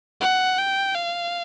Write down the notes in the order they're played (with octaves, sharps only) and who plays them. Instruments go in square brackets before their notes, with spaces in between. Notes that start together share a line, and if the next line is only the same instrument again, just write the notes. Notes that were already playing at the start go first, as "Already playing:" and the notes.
[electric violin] F#5
G5
F5